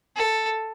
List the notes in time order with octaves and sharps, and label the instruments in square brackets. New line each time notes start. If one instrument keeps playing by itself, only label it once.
[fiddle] A4